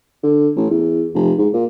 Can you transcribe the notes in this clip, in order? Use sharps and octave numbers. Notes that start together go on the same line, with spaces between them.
D3
A1
E2
F1
G#2
A#2